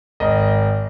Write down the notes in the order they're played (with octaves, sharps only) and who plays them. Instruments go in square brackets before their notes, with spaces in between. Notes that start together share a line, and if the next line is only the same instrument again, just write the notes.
[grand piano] G#1 D#5